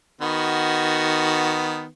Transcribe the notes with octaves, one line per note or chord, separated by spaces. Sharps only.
D#3 B3 F#4